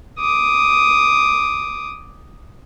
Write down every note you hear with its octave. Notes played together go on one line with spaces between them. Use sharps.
D6 D#6